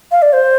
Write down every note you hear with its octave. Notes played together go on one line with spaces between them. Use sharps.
F5
D5
C5